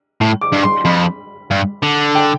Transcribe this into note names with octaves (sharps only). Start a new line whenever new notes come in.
A2
D6
G2
C6
F2 B5
G2
D3
G5